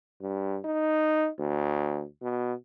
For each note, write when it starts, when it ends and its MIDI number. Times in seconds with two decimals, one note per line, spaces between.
0.21 0.58 43
0.65 1.28 63
1.39 2.04 38
2.22 2.54 47